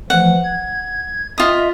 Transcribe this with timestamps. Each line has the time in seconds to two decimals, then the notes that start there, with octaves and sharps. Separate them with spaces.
0.10 E3 F3 A3 F#5
0.44 G#6
1.38 F4 D#5 E5 D#6